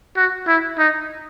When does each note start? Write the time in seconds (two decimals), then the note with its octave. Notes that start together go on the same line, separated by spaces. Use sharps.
0.17 F#4
0.47 E4
0.79 D#4